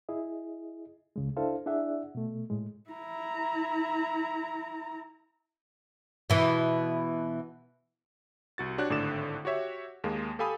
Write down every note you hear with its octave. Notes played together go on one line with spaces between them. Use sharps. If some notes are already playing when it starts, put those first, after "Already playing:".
E4 G#4 D#5
C#2 C#3 G#3
D4 E4 A4 C5 F5
D4 E4 G#4 D5 E5 F#5
B2 A3
A2 G#3
E4 A#5
B2 E3
C2 F#4 A6
D4 F#4 G4 C#5 F#6
G#1 A2 D3 D6 A6 E7
F#4 G4 C#5 E5
D#2 G#3 A#3
G4 A4 F5 G#5 B5 D#6